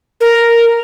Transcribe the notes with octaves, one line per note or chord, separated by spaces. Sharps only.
A#4